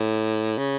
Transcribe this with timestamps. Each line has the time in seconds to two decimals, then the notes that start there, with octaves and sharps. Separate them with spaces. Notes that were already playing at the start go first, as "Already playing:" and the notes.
Already playing: A2
0.58 C#3